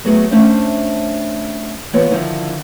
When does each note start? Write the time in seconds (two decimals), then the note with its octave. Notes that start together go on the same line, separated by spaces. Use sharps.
0.05 F#3 A3 B3 F#4 G#4
0.31 A3 C#4 D4 C5 E5
1.93 E3 A#3 B3 F4 B4 C#5
2.10 D3 D#3 F3 D4 E4